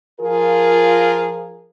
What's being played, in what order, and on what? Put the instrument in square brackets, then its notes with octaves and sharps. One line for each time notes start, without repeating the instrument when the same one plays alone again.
[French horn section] F3 F4 G#4 A#4